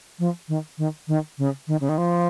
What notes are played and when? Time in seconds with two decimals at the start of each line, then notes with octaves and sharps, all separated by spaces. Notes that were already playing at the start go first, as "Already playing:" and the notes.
0.19 F3
0.48 D#3
0.78 D#3
1.08 D#3
1.38 C#3
1.67 D#3
1.81 C#3
1.89 D#3
1.98 F3